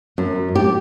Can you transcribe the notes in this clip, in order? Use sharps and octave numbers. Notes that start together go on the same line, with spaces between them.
F#2
G4